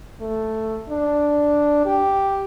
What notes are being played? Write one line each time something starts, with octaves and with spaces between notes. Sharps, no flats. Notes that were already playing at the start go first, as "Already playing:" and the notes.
A3
D4
G4